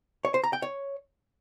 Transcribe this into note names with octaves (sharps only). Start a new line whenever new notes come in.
C#5
C5
A#5
G5
C#5